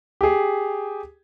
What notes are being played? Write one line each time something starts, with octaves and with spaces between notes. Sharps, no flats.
G4 G#4